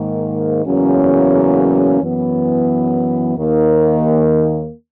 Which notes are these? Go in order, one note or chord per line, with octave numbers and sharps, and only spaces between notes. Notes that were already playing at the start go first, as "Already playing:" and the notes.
Already playing: G#2 D#3 A#3
E2 C#3 F#3 A#3 C#4
F#2 E3 B3
D#2 D#3 A#3